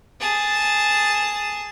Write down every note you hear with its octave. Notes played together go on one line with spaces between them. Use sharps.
G#4 A5